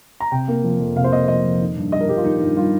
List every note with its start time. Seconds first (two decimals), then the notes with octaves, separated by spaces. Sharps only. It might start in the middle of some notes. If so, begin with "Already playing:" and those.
0.20 A#5
0.32 C3 G5
0.48 A#3
0.64 F3
0.80 F2
0.96 C3 F5
1.04 C5
1.12 A#3 D#5
1.28 F3 D#5
1.44 F2
1.60 D#3
1.76 G2
1.92 G3 D#5
2.01 A#4
2.08 G2 G4
2.16 F4
2.24 D#3 D#4
2.40 G2 D#4
2.56 G3 F4